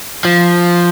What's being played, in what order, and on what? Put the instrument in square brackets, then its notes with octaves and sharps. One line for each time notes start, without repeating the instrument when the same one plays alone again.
[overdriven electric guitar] F3